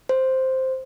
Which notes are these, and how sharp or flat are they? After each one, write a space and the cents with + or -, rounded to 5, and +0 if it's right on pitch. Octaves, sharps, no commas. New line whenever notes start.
C5 +0